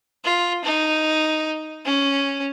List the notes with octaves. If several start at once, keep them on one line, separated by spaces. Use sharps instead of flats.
F4
D#4
C#4